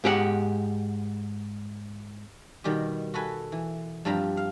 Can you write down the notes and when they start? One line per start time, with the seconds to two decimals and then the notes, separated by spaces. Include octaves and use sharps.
0.04 G#2 G4 A4 F#5
2.64 B2 D#3 G3 F#4 G4
3.14 F#4 A4 B4 G#5
3.52 E3
4.05 G2 F3 G3 C4 A#5 B5
4.37 F5